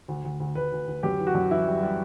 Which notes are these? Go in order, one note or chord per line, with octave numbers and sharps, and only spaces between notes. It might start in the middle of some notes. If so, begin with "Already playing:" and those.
D2
D2
D2
D2 B4
D2
D2
F#2 G4
E3
F#4
F#2
E3 E4
G3
G3